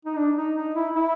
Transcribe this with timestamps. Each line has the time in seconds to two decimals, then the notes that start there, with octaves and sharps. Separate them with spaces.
0.05 D#4
0.17 D4
0.36 D#4
0.55 D#4
0.75 E4
0.93 E4